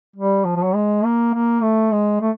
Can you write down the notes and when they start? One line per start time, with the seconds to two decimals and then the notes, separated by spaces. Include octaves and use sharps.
0.16 G3
0.45 F3
0.56 F3
0.65 F#3
0.75 G#3
1.04 A#3
1.34 A#3
1.62 A3
1.92 G#3
2.21 A3